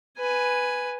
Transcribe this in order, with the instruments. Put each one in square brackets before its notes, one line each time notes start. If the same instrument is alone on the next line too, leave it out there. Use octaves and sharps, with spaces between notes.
[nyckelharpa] B4 G#5